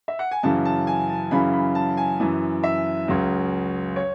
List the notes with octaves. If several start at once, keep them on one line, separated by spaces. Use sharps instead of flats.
E5
F#5
G#5
F#2 C#3 E3 A5
A5
G#5
A5
F#2 C#3 E3 B5
B5
A5
G#5
F#2 E3
E5
C#2 C#3 F#3
C#5